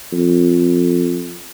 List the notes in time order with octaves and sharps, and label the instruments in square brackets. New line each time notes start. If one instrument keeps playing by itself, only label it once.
[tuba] F2